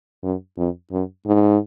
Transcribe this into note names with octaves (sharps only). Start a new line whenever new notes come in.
F#2
F2
F#2
G#2